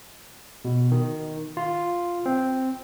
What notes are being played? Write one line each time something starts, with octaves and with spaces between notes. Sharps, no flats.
B2
D#3
F4
C4